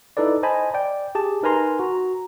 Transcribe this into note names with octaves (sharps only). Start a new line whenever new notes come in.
D#4 E4 A4 B4 D5
C5 D#5 G#5 A5 B5
D5 G5
G4 G#4 A5
D#4 A#4 B4 G#5 A#5 C6
F#4 A#5